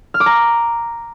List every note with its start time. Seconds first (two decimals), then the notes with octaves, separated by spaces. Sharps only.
0.14 F6
0.20 D6
0.26 A#5